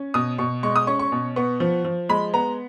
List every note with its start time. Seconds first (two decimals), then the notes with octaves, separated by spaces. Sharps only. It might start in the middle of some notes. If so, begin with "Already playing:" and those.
Already playing: C#4
0.14 B2 D#6
0.38 B2 C#6
0.63 G#3 C#6
0.76 D#6
0.87 C#4 C#6
0.99 C#6
1.12 B2
1.36 B3 C#6
1.60 F3
1.85 F3
2.09 G#3 B5
2.34 B3 A#5